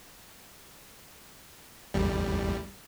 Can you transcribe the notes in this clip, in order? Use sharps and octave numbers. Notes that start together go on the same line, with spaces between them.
A1 E2 G3